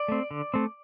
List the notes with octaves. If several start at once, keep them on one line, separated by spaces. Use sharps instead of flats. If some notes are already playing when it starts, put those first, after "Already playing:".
Already playing: D5
A3 C4
D3
A3 C4